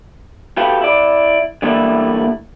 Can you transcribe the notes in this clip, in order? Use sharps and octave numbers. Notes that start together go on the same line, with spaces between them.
F#4 G4 A4 B4 F5 G5
E4 D5
D3 E3 G3 A3 A#3 E4